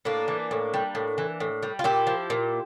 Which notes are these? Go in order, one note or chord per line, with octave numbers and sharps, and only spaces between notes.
A2 A#3 D4
E3
A2
G3
A2
E3
A2
G3
F4
A#2 E4 G4
F3
A#2